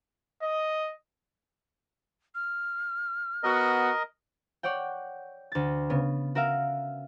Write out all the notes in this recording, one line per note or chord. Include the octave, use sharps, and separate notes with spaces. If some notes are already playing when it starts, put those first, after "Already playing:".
D#5
F6
B3 F#4 A#4 D#5
C#5 D5 F#5 G5
D2 A6
C#3 B3
F#4 A#4 E5 F5